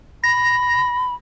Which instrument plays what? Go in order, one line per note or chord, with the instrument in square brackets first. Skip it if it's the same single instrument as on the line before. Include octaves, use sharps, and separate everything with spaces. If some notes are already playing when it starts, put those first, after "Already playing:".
[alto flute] B5 [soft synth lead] A#6